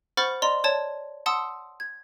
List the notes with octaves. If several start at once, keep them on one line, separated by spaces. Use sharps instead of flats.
C5 F#5 B5 C#6 F6 A6
D5 D#5 A#5 C6
C#5 D5 A5
F#5 A5 C6 D#6 E6
G#6